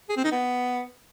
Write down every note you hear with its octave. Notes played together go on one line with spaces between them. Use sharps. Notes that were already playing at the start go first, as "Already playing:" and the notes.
G#4
C4
D#4
B3